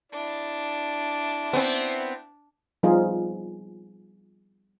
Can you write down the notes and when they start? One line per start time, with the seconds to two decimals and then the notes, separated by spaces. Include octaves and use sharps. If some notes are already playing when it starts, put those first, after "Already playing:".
0.12 D4 E4 D5
1.53 B3 C4
2.83 F3 G3 B3 D#4 F4 G#4